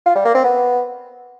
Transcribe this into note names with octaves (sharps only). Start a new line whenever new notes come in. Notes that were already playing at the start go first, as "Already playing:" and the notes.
F4
G3
A#3
C4
B3